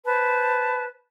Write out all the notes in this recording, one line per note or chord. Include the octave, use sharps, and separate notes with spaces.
B4 C5 A5